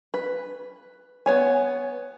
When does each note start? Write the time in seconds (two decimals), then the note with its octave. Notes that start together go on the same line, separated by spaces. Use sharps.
0.14 B4
1.26 B3 C#5 G#5